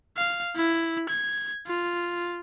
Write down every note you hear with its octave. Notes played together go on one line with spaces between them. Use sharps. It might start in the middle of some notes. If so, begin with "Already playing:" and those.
F5
E4
G#6
F4